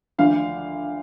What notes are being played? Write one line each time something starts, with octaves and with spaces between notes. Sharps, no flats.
D2 D3 F3 F5